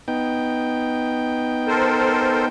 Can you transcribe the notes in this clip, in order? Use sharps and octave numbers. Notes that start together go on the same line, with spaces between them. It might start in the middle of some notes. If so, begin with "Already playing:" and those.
B3 D#4 G5
A4 A#4 C5